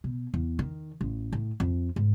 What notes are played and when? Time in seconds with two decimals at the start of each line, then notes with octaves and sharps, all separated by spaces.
0.04 B2
0.34 E2
0.59 D#3
1.01 A1
1.32 A2
1.60 F2
1.96 G#2